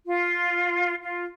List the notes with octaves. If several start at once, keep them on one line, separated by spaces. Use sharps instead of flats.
F4
F4